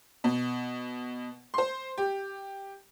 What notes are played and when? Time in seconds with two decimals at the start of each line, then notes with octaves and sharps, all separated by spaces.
0.24 B2
1.54 C5 C6
1.98 G4